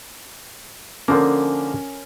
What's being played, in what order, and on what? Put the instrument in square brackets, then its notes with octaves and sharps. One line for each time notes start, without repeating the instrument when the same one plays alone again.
[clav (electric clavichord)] D3 F3 A#3 [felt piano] C#4 A#4